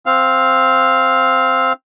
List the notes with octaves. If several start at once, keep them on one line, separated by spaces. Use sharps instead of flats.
C4 F5